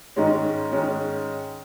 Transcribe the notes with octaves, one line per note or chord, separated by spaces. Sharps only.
G#2 D#3 G#3 C#4
G#2 D#3 G#3 C#4